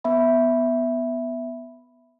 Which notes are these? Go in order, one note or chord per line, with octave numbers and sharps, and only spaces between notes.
B3 E5 B5